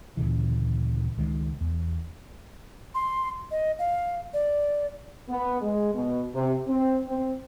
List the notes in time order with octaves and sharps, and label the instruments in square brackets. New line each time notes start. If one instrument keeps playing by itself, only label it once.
[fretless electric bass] D2 A#2 C#3 E3
C#2 D#3 G#3
E2
[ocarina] C6
D#5
F5
D5
[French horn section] B3
G#3
B2
C3
C4
C4